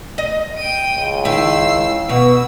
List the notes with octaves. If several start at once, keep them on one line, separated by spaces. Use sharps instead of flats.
D#5
G5 D#7
C#2
D#3 E4 E6 C7
B2 B3 E6